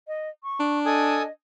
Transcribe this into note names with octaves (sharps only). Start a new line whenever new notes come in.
D#5
C#6
D4
A4 D#5 G#5 D#6